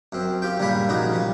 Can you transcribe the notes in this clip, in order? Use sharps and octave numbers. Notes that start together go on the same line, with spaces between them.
F#2 C4
F4 G4 G5
G2 A#2 C#3 G3 C#5 B5
A#1 C#3 D#4 F#4 D5 D#6
F3 G3